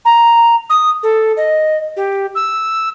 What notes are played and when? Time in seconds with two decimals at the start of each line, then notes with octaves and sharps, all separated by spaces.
0.05 A#5
0.70 D#6
1.03 A4
1.37 D#5
1.97 G4
2.35 E6